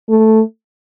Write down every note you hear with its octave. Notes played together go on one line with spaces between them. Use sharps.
A3